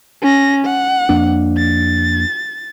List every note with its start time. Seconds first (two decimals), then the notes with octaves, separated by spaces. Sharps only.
0.22 C#4 A#6
0.65 F#5
1.09 F2 A#3 D4
1.58 A6